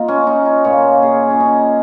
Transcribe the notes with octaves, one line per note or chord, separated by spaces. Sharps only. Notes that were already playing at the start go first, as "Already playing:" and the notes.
Already playing: A#3 D#4 F4
C#4
D#4
D#4
A#2 A#3 C#5
G#4
C#4
D#4